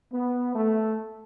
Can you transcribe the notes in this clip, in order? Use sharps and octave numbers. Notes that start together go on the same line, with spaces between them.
B3
A3